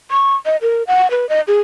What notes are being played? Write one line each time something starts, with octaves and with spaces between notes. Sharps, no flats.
C#6
D#5
A#4
F#5
B4
D#5
G#4